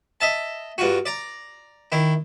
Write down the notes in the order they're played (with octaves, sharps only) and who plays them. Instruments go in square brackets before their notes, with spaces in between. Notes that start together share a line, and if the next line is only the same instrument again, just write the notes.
[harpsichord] D#5 E5 A5
G2 F4 F#4
D5 A#5
D#3 E4